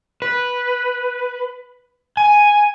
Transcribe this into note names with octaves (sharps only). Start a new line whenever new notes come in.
B4
G#5